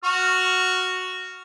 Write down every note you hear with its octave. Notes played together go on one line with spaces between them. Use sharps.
F#4 C#6 F6